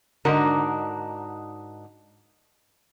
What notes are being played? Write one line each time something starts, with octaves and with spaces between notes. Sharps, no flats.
G#2 D3 D4 D#4 F#4 A#4